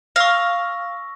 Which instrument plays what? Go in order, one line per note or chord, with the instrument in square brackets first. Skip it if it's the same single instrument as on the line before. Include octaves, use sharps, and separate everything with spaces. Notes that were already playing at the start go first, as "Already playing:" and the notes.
[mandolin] F5 [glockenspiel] C#6 E6 A#6